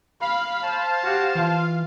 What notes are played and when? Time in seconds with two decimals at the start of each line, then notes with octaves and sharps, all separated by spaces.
0.21 F5 B5
0.64 C5 A5
1.03 F#4 G4
1.35 E3 F4